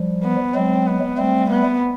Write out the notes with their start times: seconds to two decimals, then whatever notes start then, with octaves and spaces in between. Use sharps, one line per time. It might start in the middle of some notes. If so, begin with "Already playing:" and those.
Already playing: F3 G3
0.23 B3
0.55 F#3 G#3 C4
0.87 B3
1.18 G3 A3 C4
1.51 B3